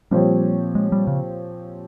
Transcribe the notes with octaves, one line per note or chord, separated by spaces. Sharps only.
A#2 F3 G3 C4 G4 C#5
G#3
G3
C#3